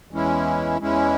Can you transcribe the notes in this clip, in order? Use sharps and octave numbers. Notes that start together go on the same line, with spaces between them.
E2 E3 G#3 C#4 E4
E2 E3 G#3 C#4 E4